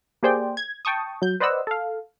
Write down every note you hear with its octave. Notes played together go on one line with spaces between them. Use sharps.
A#3 G4 G#4 C5 D5 G5
G#6
G5 A5 C#6 D#6
F#3 G6
B4 C5 D5 D#5 F#5 E6
A4 F5